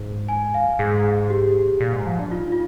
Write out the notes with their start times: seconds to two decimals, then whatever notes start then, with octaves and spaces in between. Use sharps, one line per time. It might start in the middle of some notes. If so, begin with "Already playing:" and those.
Already playing: G#2
0.29 G#5
0.54 F5
0.79 G#2 G#4
1.30 G4
1.80 A#2
1.93 G#2
2.06 F3
2.19 D4
2.32 D#4 F4
2.52 F4